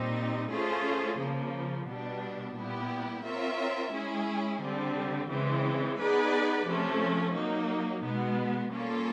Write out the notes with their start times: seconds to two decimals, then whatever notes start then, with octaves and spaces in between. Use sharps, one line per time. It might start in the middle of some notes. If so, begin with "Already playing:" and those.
Already playing: A#2 G3 C4 D#4
0.52 A3 C#4 F4 G#4 C5
1.20 C#3 F3 A#3
1.88 B2 G3 B3 D4
2.57 A#2 G3 B3 E4 G4
3.25 C4 F4 A#4 C#5 E5
3.94 G#3 C#4 E4 G#4
4.62 D3 G3 C4
5.31 C#3 E3 G#3 C4
5.99 B3 D#4 G#4 B4 D5
6.68 C3 F3 A3 C#4
7.36 F#3 A#3 D#4
8.04 B2 G#3 B3
8.72 G3 A#3 C#4 F4 A4